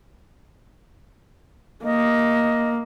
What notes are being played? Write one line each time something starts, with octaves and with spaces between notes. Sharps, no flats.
A#3 D#5